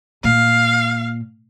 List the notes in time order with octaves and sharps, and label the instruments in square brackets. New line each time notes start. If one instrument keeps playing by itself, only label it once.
[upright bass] A#2 [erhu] F5